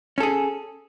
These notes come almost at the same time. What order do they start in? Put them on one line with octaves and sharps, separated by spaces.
C#4 A4 G#4